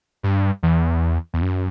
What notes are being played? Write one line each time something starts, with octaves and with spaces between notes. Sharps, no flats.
G2
E2
E2
F#2